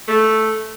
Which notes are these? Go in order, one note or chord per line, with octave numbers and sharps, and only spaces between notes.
A3